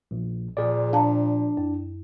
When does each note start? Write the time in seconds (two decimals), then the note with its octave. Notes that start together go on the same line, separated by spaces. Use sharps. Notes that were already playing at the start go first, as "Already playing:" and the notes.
0.11 A#1
0.57 A#2 F3 G#4 D5
0.93 D4 F5 A5 A#5
1.57 F#2